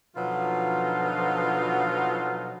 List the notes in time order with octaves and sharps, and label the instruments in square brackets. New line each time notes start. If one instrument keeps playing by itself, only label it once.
[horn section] B2 D3 F3 F#3 D#4 F4